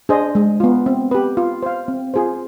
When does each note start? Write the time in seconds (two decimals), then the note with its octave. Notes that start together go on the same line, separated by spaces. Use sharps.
0.09 D4 G#4 C5 D#5
0.35 G#3
0.60 B3 F4
0.86 C4
1.11 G4 B4
1.37 F4
1.63 C5 F5
1.88 C4
2.14 F4 G#4 C5